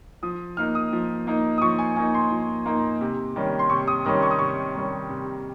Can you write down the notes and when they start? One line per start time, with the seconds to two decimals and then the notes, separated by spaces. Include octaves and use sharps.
0.23 F3 D#6
0.57 A#3 D#4 F6
0.75 D#6
0.93 F3
1.27 A#3 D#4
1.58 D#6
1.62 F3 C#6
1.79 G#5
1.96 A#3 D#4 G#5
2.15 C6
2.32 F3
2.66 A#3 D#4
3.01 C3
3.36 D#3 G3 C#4
3.59 C6
3.70 C3 C#6
3.88 D#6
4.05 D#3 G3 C#4 D#6
4.22 C#6
4.31 D#6
4.39 C3 C#6
4.74 D#3 G3 C#4
5.09 C3